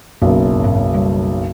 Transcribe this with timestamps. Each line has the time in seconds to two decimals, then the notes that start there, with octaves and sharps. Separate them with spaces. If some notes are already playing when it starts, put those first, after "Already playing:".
0.22 F#1 B1 F#2
0.63 G#2 A#3 C4
0.93 C#3 F#3 G3